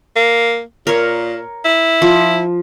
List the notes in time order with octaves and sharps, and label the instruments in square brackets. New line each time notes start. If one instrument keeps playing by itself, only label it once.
[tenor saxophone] A#3
[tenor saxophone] A#2 [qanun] A#4 C#5
[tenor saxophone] E4
[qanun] F3